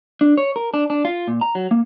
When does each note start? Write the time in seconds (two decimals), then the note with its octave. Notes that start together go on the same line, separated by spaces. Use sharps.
0.21 D4
0.38 C#5
0.56 A#4
0.74 D4
0.90 D4
1.05 F4
1.28 A#2
1.41 A#5
1.55 F#3
1.71 A#3